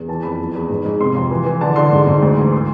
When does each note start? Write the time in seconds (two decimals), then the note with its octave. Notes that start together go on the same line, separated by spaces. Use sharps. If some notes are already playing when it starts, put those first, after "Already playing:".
Already playing: E2
0.08 E3 A5
0.23 F2 B5
0.39 E2
0.55 E2
0.69 G#2
0.85 G#2
1.00 C3 C6
1.15 F2
1.31 E3
1.46 E3
1.61 D3 A5
1.76 D3 C6
1.92 G#2
2.07 G#2
2.22 D2
2.37 E3
2.52 C6